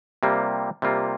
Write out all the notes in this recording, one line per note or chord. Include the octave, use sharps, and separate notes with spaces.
C3 G3 A#3 F4
C3 G3 A#3 F4